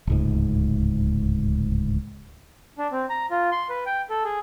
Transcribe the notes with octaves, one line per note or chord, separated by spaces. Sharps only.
D1 C#2 G#2
D4
C4
A#5
F4
C6
B4
G5
A4
G#4